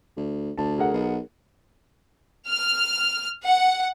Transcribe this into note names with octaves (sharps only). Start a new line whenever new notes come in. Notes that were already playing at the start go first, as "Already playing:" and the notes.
D2
D2 A5
G#4 A#4 F#5
B1
F6
F#5